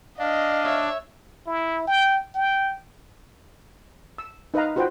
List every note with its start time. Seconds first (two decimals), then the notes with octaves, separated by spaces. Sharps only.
0.19 D4 D#5 F5
0.64 C#5 E5
1.46 E4
1.87 G5
2.35 G5
4.18 E6
4.54 D#4 B4 D#5 F5 A#5
4.76 F4 F#4 B4 C5 G5